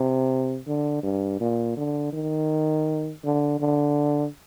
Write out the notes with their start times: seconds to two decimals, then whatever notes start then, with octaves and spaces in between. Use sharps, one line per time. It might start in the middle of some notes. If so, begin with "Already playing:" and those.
Already playing: C3
0.67 D3
1.03 G2
1.40 A#2
1.77 D3
2.13 D#3
3.24 D3
3.60 D3